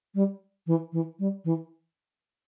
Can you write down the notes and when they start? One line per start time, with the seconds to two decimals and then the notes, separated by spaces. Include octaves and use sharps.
0.15 G3
0.67 E3
0.93 E3
1.19 G3
1.45 E3